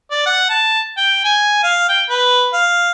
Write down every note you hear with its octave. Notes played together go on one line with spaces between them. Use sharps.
D5
F#5
A5
G5
G#5
F5
G5
B4
F5